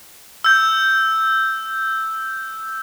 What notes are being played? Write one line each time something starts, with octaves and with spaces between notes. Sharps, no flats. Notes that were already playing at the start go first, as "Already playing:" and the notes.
E6 G6